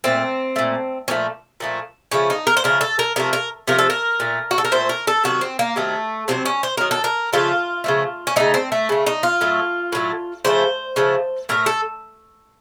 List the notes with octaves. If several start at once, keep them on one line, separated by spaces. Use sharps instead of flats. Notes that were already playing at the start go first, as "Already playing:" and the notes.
A#2 A3 C4
A#2 A3
A#2 F3 A3 C#4
A#2 F3 A3
C#3 F3 A3 C#4
D#4
A#4
C5
C#3 F3 A3 A#4
A4
A#4
C3 F3 A3 A#4
A#4
C3 F3 A3 A#4
A4
A#4
A#2 A3
F#4
A4
A#4
A#2 A3 C5
A#4
A4
C3 D#3 F#3 F#4
C4
A#3
C3 D#3 F#3 A3
C3 D#3 F#3 C4
C#4
C5
C3 D#3 F#3 A#4
A4
A#4
C#3 F3 A3 F4
C#3 F3 A3
C#4
C#3 A3 D#4
C4
A3
C#3 A3
D#4
F4
A2 F#3 A3
A2 F#3 A3
C#3 F3 A3 C5
C#3 F3 A3
A2 A3 A#4
A4